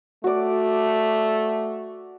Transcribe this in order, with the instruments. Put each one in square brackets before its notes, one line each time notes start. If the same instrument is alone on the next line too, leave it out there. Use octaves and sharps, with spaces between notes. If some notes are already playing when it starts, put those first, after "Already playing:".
[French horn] A3 [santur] F#4 D5